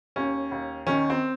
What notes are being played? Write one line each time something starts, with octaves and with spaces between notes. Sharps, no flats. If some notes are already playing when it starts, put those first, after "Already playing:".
D#2 C#4
D#2
D#3 C#4
C4